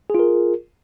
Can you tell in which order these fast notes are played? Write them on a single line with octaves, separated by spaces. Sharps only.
G#4 F4 A#4